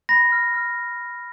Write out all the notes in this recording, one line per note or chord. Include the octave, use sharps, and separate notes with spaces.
B5 A#6
F6
F6